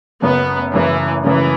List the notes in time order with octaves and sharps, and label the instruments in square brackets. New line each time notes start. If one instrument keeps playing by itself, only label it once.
[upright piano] F#1 F#2 C#3 [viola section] B3
[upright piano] F#1 F#2 C#3 [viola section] E3
[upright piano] F#1 F#2 C#3 [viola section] E3